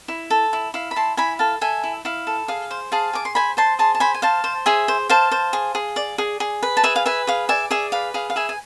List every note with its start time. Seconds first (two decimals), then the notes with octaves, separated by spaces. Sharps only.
0.08 E4
0.30 A4
0.53 E4
0.74 E4 F5
0.91 B5
0.96 E4 A5 C6
1.17 E4 G#5 B5
1.39 A4 F5 A5
1.61 A4 E5 G#5
1.84 E4
2.05 E4 F5
2.27 A4
2.48 G#4 F5
2.71 C5
2.92 G#4 F5 A5
3.13 G#4 D6
3.25 C6
3.35 C5 G#5 B5
3.57 C5 A5 C6
3.79 G#4 A5 C6
3.95 A5
4.00 C5 G#5 B5
4.14 G#5
4.22 C5 F5 A5
4.44 C5
4.66 G#4 E5 G#5
4.88 C5
5.09 C5 F5 A5
5.32 C5
5.53 G#4
5.75 G#4
5.96 D5
6.18 G#4
6.40 G#4
6.63 B4
6.77 A5
6.84 G#4 E5 G#5
6.96 F5
7.06 B4 E5 G#5
7.27 G#4 F5
7.49 D5 E5 G#5
7.71 G#4 E5 G#5
7.92 B4 F5
8.14 G#4 F5
8.30 F5
8.36 G#4 E5 G#5
8.49 G#5